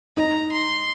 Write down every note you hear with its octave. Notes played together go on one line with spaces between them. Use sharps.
D#4 A#5
C6